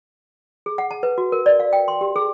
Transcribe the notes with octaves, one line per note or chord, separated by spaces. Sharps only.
G#4
F#5
A5
B4
F#4
A#4
D5
F5
G5
C6
G4
G#4